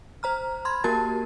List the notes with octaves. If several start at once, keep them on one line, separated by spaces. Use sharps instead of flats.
C5 A#5 F6
B5 C6 G#6
A#3 F#4 G4 A#4 A5 A6